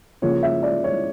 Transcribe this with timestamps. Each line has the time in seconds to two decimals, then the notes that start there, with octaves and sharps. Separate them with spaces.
0.22 C#3 F3 A#3 C#5
0.43 E5
0.63 D5
0.84 C#5